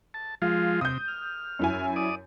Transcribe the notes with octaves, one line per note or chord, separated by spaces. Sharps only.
A5
F3 G#3 F4 F5
C3 D#6 G6
F6
F#2 E4 G#5
D5 D#6